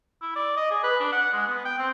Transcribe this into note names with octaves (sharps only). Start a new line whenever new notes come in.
E4
D5
D#5
G#4
B4
D4
F#5
G#3
B3
G5
C4